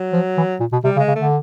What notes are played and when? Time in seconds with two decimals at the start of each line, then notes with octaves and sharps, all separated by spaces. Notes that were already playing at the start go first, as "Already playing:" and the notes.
Already playing: F#3
0.13 F3
0.37 E3
0.60 A#2
0.73 B2
0.84 C3 G3
0.96 C#3
0.99 G#3
1.08 C#3
1.15 D3 A3